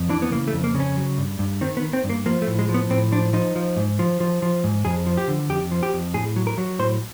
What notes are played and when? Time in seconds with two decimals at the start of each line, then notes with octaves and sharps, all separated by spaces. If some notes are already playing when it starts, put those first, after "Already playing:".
Already playing: F2
0.09 E3 D4
0.22 B3
0.31 C#3 A#3
0.48 A3
0.53 F2
0.64 A#3
0.74 C#3
0.80 C#4
0.97 F#3
1.18 G2
1.39 G2
1.61 D#3 C4
1.77 B3
1.82 D#3
1.93 C4
2.04 G2
2.10 A#3
2.26 F3 A#3
2.42 A3
2.47 A2
2.59 G#3
2.69 F3
2.74 B3
2.90 A2 C4
3.12 F3 D4
3.33 F3 D#4
3.56 F3
3.76 G#2
3.99 F3
4.20 F3
4.42 F3
4.64 G#2
4.85 F2 G#4
5.06 F3
5.17 G4
5.28 D3
5.49 F2 G4
5.71 F3
5.83 G4
5.93 F2
6.14 A2 G#4
6.36 F#3
6.47 A#4
6.58 F#3
6.79 A2 C5